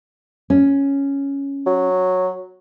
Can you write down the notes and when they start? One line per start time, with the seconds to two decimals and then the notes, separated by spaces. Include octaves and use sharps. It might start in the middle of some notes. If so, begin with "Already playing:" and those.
0.50 C#4
1.66 F#3